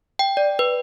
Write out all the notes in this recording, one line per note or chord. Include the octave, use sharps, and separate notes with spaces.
G5
D5
B4